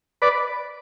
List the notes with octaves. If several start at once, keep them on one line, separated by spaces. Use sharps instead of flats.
B4 D5